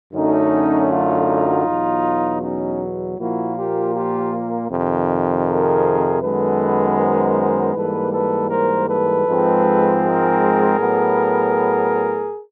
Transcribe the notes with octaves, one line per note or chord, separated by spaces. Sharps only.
F#2 D3 F#3 A3 C#4 D#4
D#4 F4
E2 B2 F#3
C#4 D#4
A#2 F3 A#3 E4 F#4
F4 G4
F4 G4
F2 C3 D#3
G#4 A#4
F#2 D#3 G#3 B3 A4 B4
A#4 C5
G#2 E3 G3 A#3 A4 B4
A4 B4
A#4 C5
A4 B4
G#2 F3 G#3 C4
G#4 A#4
A2 F#3 B3